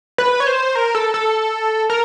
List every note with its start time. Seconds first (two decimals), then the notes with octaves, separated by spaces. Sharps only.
0.18 B4
0.40 C#5
0.47 C5
0.75 A#4
0.95 A4
1.14 A4
1.90 A#4